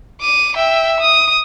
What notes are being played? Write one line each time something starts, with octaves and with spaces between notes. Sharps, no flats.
D6 D#7
E5 G5
D#6